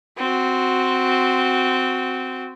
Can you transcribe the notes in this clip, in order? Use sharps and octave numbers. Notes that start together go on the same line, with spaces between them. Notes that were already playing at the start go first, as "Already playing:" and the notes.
C4 F#4